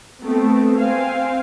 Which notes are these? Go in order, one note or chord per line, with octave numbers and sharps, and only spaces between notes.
A3 B3 C4
C4 C5 F5 G#5